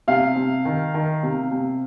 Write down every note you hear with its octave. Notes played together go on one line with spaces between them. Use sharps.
C3 F5
C3
D#3
D#3
C3
C3